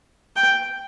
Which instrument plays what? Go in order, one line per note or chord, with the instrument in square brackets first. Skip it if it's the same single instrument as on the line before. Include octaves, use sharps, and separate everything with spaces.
[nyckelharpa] G5